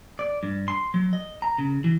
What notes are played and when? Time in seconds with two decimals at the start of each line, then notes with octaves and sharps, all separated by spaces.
0.19 D5
0.43 G2
0.68 C6
0.94 F#3
1.13 D#5
1.42 A#5
1.58 C#3
1.84 E3